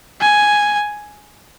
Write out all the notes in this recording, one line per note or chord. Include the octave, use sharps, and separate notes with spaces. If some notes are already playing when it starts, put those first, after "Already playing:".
G#5